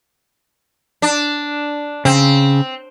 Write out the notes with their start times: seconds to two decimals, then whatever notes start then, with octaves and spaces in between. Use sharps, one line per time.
1.02 D4
2.05 C#3 C4